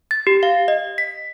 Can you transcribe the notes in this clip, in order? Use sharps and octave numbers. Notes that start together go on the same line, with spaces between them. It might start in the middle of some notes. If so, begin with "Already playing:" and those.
A6
G4
F5
D#5
B6